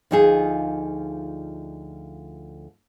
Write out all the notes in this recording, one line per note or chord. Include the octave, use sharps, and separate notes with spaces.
D2 F3 D#4 F4 G#4